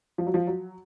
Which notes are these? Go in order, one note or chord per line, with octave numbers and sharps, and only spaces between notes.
F3
F#3
F3
F#3